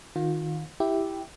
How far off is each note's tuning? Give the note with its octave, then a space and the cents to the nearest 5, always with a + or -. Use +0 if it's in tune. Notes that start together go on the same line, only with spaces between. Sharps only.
D#3 +0 F4 +35
E4 +0 G4 +0 E5 -5